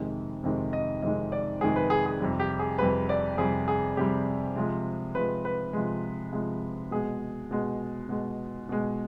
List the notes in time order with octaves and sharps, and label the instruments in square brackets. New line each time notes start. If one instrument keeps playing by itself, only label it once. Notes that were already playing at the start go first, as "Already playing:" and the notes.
Already playing: [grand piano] F2 C3 D#3 G#3
F2 C3 D#3 G#3
D#5
F2 C3 D#3 G#3 D#5
D5
F2 C3 D#3 G#3 G#4
B4
G#4
G#4
F2 C3 G3
G4
G#4
F2 C3 G3 B4
D5
F2 C3 G3 G#4
G#4
F2 C3 G3 G4
C3 F3 G#3
C3 F3 G#3 B4
B4
C3 F3 G#3
C3 F3 G#3
B2 G#3 G#4
B2 G#3
B2 G#3
B2 G#3